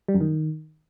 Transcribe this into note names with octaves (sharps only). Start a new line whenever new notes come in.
G3
F#2
D#3